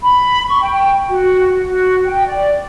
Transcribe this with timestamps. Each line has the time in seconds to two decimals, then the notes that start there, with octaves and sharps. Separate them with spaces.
0.03 B5
0.48 C#6
0.61 G5
1.09 F#4
1.68 F#4
2.06 G5
2.27 D5